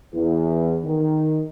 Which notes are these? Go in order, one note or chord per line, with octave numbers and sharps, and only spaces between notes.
E2
D#3